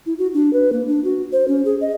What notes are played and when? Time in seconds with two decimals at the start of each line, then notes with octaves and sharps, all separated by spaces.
0.06 E4
0.19 F#4
0.34 D4
0.53 B4
0.73 A#3
0.87 D4
1.04 F#4
1.32 C5
1.48 C#4
1.65 G#4
1.81 D#5